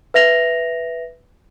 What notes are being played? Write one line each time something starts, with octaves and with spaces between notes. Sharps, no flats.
B4 E5 A#6 F7